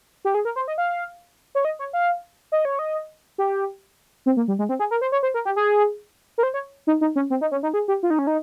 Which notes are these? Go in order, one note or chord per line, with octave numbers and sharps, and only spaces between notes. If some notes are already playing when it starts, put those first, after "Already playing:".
G4
G#4
A#4
C5
D#5
F5
C#5
D#5
C#5
F5
D#5
C#5
D#5
G4
C4
A#3
G3
G#3
C4
G#4
A#4
C5
C#5
C5
A#4
G4
G#4
A#4
C5
C#5
D#4
D#4
C#4
C4
D#4
C#4
D#4
G#4
G4
F4
D#4
C#4
D#4